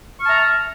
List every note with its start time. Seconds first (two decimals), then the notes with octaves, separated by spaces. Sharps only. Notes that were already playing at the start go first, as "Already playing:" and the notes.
0.18 C#6
0.21 F6
0.24 A5
0.27 A#5
0.29 E5